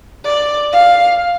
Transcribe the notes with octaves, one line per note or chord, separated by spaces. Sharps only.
D5
F5